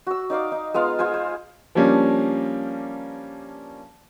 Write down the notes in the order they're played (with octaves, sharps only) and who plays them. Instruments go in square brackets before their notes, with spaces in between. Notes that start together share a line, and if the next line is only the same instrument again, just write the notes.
[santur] F#4 E6
D#4 D5 F5 D6
D#4
G#3 B3 F4 F5
F4 G#4 C5 G#5
C5
[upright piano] F3 G3 A#3 C#4 D4